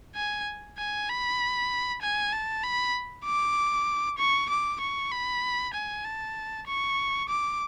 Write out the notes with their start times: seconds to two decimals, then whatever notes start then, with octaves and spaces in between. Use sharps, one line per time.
0.15 G#5
0.78 G#5
1.09 B5
2.02 G#5
2.33 A5
2.63 B5
3.25 D6
4.19 C#6
4.50 D6
4.81 C#6
5.12 B5
5.74 G#5
6.05 A5
6.67 C#6
7.29 D6